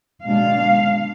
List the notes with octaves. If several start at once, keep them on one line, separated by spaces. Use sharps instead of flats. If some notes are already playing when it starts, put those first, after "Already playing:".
B2 G#3 D4 F5